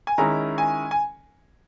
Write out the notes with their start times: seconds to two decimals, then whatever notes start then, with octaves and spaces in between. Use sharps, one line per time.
0.07 G#5
0.18 D#3 G#3 C#4 E4 A#5
0.58 G#5
0.91 G#5